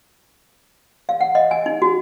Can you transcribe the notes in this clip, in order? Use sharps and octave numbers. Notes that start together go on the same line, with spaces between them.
F5
F#5
D#5
G#5
D#4
F#4